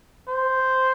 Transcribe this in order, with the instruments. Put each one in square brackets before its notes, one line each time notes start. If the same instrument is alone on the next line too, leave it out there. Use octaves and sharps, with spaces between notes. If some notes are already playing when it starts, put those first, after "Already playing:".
[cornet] C5